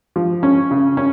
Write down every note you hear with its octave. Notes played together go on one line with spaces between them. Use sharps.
F3
C#4
C#3
C#4